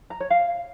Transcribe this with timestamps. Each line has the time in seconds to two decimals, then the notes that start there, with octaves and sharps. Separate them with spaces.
0.10 A#5
0.20 C#5
0.30 F5